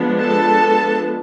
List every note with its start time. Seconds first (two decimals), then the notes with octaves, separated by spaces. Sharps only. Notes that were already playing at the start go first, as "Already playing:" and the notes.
Already playing: F3 G#3 B3 D4
0.20 A4 A5